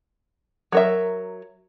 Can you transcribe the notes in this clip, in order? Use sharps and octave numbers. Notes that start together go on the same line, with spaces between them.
F#3 A#4 E5